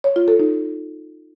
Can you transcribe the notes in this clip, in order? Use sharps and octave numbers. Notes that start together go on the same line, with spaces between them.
C#5
F4
A4
D#4